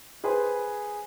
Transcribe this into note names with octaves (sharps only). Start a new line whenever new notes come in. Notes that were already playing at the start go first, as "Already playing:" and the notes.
G#4 B4 C5 G#5